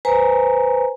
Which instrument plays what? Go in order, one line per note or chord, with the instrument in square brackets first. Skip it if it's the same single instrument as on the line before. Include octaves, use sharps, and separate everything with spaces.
[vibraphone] B4 C5 G#5 A#5